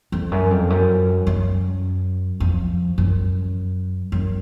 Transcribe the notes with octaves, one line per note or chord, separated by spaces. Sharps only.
F2
F#2
F2
F#2
F#2
F2
F#2
F#2